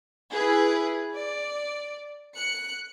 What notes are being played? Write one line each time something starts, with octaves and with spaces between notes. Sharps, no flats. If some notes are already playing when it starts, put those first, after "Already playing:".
E4 G#4 B4
D5
F#6 C#7